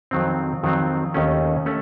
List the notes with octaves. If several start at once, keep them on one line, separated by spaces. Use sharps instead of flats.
F2 D#3 F#3 C4
F2 D#3 F#3 C4
D#2 D#3 A3 C#4
A3 C#4